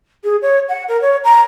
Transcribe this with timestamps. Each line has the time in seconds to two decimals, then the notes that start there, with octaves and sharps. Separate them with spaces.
0.24 G#4
0.42 C#5
0.69 F#5
0.88 A#4
1.02 C#5
1.24 A#5